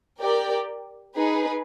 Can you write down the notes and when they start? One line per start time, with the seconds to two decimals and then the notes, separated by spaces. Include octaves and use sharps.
0.20 G4 A#4 D5 G5
1.15 D#4 G#4 B4